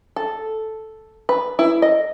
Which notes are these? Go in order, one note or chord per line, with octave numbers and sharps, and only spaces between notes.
A4
B4
E4
D#5